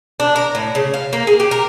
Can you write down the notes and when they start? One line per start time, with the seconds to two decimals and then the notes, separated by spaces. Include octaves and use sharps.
0.20 D4
0.36 A#4
0.55 A2
0.75 C#3
0.94 F5
1.13 A#3
1.27 G#4
1.40 G4
1.51 A#4